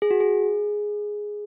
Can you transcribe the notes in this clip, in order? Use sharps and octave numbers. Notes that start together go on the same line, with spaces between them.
G#4
F#4
G#4